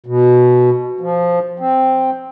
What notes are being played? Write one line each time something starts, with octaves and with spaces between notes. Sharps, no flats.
B2
F3
C4